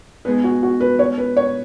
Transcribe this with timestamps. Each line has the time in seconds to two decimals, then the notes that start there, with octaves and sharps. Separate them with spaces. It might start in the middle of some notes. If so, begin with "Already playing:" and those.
0.25 B2 G#3 B3 D#4 G#4 B4
0.44 F#4
0.63 F#4
0.81 B4
0.99 C#5
1.18 B4
1.37 C#5